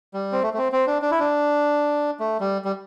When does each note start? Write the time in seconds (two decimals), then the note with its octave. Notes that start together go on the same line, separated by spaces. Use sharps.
0.14 G3
0.32 C4
0.43 A3
0.54 A3
0.58 C4
0.72 C4
0.87 D4
1.02 D4
1.11 E4
1.20 D4
2.20 A3
2.40 G3
2.65 G3